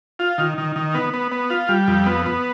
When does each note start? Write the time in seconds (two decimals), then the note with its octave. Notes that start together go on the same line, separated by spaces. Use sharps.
0.19 F4
0.38 D#3
0.58 D#3
0.76 D#3
0.95 B3
1.14 B3
1.32 B3
1.50 F4
1.69 G3
1.88 F2
2.06 B3
2.26 B3